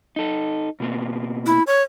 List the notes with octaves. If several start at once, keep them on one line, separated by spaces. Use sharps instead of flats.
D#4 A4
B2 A#3 C4
E4
C#5